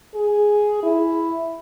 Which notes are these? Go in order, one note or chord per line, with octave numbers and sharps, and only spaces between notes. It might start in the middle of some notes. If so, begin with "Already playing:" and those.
G#4
E4